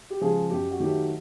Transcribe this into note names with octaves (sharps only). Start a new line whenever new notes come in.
G4
C#3 F3 G#3 G#4
F#2 G4
F#4
D#3 F#3 A3 G4